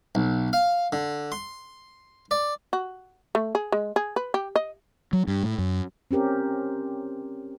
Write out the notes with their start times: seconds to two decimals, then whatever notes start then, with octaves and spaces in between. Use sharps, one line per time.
0.15 B1
0.53 F5
0.93 D3
1.32 C6
2.31 D5
2.73 F#4
3.35 A3
3.55 G#4
3.72 G#3
3.96 G#4
4.16 B4
4.34 G4
4.56 D#5
5.13 F#3
5.27 G2
5.43 A2
5.58 F#2
6.11 C4 C#4 G4 A#4